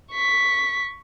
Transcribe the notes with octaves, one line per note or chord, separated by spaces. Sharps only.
C#6 B6